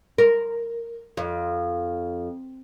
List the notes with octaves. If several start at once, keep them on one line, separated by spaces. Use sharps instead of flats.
A#4
F2